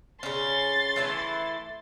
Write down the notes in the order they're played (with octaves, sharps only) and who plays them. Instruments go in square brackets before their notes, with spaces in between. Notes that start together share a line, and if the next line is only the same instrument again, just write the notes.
[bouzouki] C#3 C#4 [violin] C6 A6
[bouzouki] E3 A3 E4